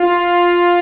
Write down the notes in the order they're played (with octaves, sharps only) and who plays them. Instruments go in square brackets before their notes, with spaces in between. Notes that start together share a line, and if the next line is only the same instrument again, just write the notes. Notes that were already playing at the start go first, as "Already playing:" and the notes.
Already playing: [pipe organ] F4